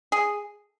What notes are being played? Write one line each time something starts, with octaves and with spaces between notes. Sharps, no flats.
G#4